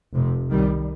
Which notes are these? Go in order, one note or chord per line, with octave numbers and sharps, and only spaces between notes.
F1 F2 C3
C2 C3 D#3 G3